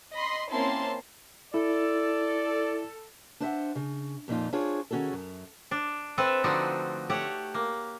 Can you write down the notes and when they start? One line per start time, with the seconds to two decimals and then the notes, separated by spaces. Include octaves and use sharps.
0.12 D#5 B5 C6
0.50 A#3 C4 C#4 E4 A5 C6
1.54 E4 A4 D5
3.40 D4 C5 E5 F#5
3.75 C#3
4.28 F2 A#2 F3 D#4 F4
4.53 D4 F4 G#4 C5 C#5
4.91 D#3 C#4 F#4 G#4 A4
5.13 F#2
5.71 D4
6.18 C4 A4 B4 E5 G5
6.44 D3 F3 A3 D4 D#4 F#4
7.10 A3 G4 C#5 F#5
7.54 A#3